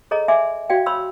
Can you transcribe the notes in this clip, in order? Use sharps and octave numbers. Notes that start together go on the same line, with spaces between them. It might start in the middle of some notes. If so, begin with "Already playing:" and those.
G#4 A4 C#5 D#5 A#5
D5 E5 G#5 C6 D6
F#4 D5 F5 G5
C#5 B5 C6 E6